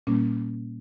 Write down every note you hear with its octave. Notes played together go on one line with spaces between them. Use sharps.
A#2 G3 A#3 C#4